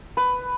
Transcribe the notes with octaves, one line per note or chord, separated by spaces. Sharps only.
B4